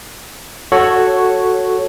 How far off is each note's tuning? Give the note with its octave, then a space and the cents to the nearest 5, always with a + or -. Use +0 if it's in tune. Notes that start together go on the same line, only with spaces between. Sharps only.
F#4 +0 A4 +0 C#5 -5